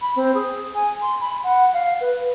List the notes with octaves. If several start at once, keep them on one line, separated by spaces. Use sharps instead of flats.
B5
C4
G#4
G#5
C6
B5
F#5
F5
B4